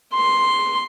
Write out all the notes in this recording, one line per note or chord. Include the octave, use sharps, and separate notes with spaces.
C6